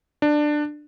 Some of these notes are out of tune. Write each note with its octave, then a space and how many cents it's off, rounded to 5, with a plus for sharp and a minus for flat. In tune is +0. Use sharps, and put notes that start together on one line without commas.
D4 +15